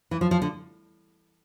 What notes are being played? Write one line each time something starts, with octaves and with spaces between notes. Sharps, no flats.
E3
F3
F3
D3